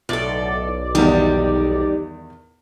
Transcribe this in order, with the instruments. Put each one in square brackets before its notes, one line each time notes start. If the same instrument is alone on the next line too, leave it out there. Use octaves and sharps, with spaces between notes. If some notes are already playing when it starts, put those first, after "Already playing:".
[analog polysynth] B1 D5 [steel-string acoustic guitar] A2 A4
[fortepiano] E2 D#3 [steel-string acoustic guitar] G3 D#4